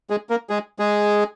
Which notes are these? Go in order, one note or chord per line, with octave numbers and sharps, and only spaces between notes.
G#3 G#4
A#3 A#4
G#3 G#4
G#3 G#4